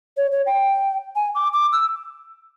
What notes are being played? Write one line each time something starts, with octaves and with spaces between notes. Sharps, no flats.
C#5
C#5
G5
G#5
D6
D6
E6